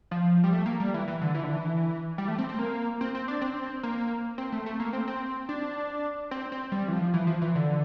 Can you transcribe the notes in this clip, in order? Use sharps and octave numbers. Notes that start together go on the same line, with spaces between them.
F3
G3
A3
A#3
G3
E3
E3
D3
E3
D3
E3
G3
A3
C4
C4
A#3
C4
C4
D4
C4
A#3
C4
A3
A3
A#3
C4
C4
D4
C4
C4
G3
E3
F3
E3
F3
E3
D3